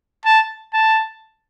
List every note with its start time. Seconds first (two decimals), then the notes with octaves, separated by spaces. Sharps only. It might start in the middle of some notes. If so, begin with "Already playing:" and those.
0.26 A5
0.74 A5